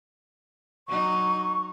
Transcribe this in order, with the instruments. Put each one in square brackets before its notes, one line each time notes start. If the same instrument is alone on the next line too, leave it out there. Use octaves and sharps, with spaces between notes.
[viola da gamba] F#3 D#4 [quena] C#6